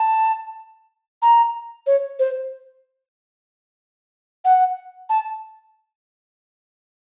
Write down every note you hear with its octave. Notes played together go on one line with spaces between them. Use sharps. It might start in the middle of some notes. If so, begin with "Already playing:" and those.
Already playing: A5
A#5
C#5
C5
F#5
A5